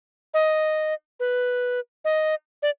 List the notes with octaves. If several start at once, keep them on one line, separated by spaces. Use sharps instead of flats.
D#5
B4
D#5
D5